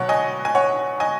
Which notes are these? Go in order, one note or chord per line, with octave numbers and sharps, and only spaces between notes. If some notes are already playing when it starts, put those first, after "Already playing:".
Already playing: B2 F#3 C#5 F#5
D#5 G#5
G#5
C#5 F#5
D#5 G#5